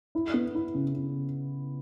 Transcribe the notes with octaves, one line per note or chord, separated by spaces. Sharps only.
E4
B3
E4
C#3
C#3